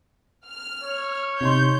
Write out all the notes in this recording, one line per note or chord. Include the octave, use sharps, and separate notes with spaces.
F6
C#5
C3 D#4 C6 G6